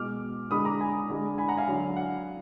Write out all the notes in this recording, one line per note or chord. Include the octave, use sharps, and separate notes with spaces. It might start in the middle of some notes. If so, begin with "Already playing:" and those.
Already playing: B2 G#3 D6 F6
D3 G#3 B5 D#6
A#5 D6
G#5 B5
D3 G#3
G#5 B5
F#5 A#5
F5 G#5
D3 F#3
F#5